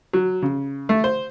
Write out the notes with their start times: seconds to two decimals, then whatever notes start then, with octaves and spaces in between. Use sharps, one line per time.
0.13 F#3
0.42 C#3
0.89 A3
1.04 C5